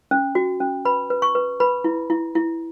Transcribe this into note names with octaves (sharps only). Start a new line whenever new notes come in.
C#4
F#4
C#4
B4 B5
B4
C#6
B4
B4 B5
E4
E4
E4